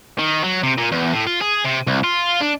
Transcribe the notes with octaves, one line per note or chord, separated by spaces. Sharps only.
D#3
F#3
C3
A#2
E2
A2
F4
G#4
C3
C2
F4
D4